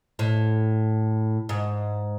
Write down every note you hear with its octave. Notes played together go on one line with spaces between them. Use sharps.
A2
G#2